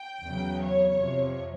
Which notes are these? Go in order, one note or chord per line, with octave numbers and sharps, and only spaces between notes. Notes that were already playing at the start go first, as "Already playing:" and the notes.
Already playing: G5
E2 C#3 F#3
C#5
F2 C3 F3